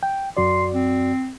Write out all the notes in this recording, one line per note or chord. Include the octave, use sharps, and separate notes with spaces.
G5
F#2 F#4 D5 C6
C4